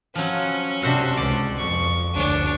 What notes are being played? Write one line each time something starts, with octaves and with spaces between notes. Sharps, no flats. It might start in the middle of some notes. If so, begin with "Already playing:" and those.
F3 F#3 C#4
C3 C4 D4 F#4 C5
C#2 D5
F2 F3 C#6
F#1 D2 D4 C#5